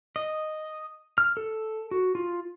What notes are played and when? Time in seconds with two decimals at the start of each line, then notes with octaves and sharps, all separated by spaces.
0.16 D#5
1.18 F6
1.37 A4
1.91 F#4
2.15 F4